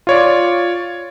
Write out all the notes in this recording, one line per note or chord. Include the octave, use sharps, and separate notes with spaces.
F4 C#5 D5